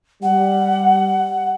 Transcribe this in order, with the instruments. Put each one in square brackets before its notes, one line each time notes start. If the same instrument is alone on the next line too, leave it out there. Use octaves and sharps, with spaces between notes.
[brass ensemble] G3 [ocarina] F#5